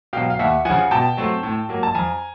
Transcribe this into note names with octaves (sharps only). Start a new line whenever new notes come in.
B2 F#3 F5 G5
F5
D#2 E5 F#5
C#3 F3 F#5 G#5
B2 G5 A5
F#3 A3 C4
A2
F#3 A#3
A5
F2 G#5 A#5